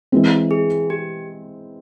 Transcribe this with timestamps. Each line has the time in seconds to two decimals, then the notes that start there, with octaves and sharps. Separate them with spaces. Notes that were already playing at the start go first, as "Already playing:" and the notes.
0.12 E3 G#3 C4
0.51 G#4
0.90 G4